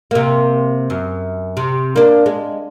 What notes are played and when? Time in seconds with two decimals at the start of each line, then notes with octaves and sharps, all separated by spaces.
0.11 C3 A#3
0.90 F#2
1.57 C3
1.96 A#3 D4
2.26 G#3